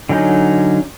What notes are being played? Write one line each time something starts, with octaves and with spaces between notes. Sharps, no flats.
D3 F#3 C#4 D#4